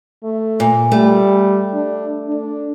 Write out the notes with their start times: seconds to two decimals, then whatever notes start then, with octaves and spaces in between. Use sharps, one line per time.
0.23 A3
0.60 A#2
0.92 G3 A3
1.74 D4
2.28 D4